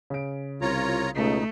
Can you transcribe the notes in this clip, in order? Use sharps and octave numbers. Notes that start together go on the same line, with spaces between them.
C#3 D7
C2 F4 C#5 A#5
C#2 B2 A3 D#4